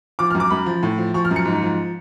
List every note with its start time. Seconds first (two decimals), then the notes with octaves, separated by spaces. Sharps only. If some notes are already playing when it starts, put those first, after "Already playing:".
0.19 F3 D6
0.30 F6
0.35 F#2
0.40 D6
0.50 F#2 B5
0.66 F3
0.83 A2
0.98 F3
1.14 F3 C#6
1.25 F6
1.31 F#2
1.36 C#7
1.45 G#2
1.62 F3